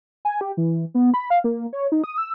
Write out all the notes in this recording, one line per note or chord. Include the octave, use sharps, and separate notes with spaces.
G#5
G4
E3
B3
B5
F5
A#3
C#5
D#4
D#6
E6